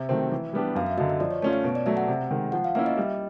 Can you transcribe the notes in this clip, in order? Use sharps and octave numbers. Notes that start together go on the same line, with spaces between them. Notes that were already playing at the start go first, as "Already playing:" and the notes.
Already playing: C3 E5
D#3 F#3 A3 C4
E3
G3 B3 D4 G4
F#2 F5
E5
D3 F#3 D#5
D#5
F3 D5
C#5
A3 C#4 F4 C#5
C#5
B2
D5
F#3 A3 E5
F#5
C3
D#3 G#3
F3 F#5
F5
A#3 C#4 E4 E5
D#5
G3